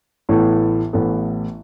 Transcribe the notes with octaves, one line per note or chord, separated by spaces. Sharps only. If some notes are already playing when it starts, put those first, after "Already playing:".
A1 A2 E3 B3 A4
A1 A2 E3 B3 A4